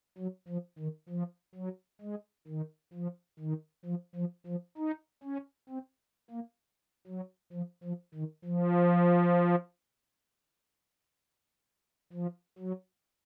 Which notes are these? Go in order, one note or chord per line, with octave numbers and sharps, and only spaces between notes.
F#3
F3
D#3
F3
F#3
G#3
D#3
F3
D#3
F3
F3
F3
D#4
C#4
C4
A#3
F#3
F3
F3
D#3
F3
F3
F#3